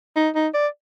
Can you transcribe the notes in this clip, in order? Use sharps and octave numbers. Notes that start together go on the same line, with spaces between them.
D#4
D#4
D5